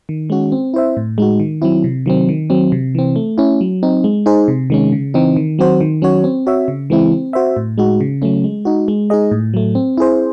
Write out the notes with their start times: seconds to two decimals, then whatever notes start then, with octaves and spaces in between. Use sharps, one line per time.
0.09 D#3
0.30 G#3 C#4 F#4
0.52 C4
0.74 E4 C5 E5
0.97 A2
1.18 G#3 D#4 F#4
1.40 D#3
1.62 F#3 C4 E4
1.84 C3
2.06 D#3 F#3 C4
2.29 D#3
2.50 F#3 C4
2.72 C3
2.95 E3 C4
3.16 A3
3.38 C#4 E4
3.61 F#3
3.83 C4 D#4
4.04 G#3
4.26 D#4 G#4 C5
4.48 C3
4.70 D#3 G#3 C#4
4.92 C#3
5.14 E3 C4 D#4
5.36 D#3
5.59 F#3 C4 F#4 C5
5.81 D#3
6.02 F#3 C#4 F#4 C#5
6.24 C4
6.47 F#4 C#5 E5
6.68 C#3
6.90 E3 G#3 C4 E4
7.12 C4
7.33 F#4 C5 E5
7.57 A2
7.78 G#3 D#4 F#4
8.00 C#3
8.22 F#3 A3 C#4
8.44 G#3
8.65 D#4 F#4
8.88 G#3
9.10 D#4 G#4 D#5
9.31 A2
9.54 F#3 A3
9.75 C4
9.98 E4 G#4 C5